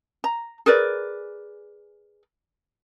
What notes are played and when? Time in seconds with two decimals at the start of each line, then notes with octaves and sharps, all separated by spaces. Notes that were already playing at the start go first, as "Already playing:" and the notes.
0.24 A#5
0.66 G#4 A#4 B4 D5